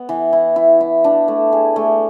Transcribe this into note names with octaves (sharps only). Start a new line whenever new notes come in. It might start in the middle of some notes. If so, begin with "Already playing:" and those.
Already playing: B3
E3
E4
E4
E4
D4
A3
G#4
A3